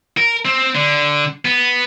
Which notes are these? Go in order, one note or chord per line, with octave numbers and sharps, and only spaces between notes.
A#4
C4
D3
B3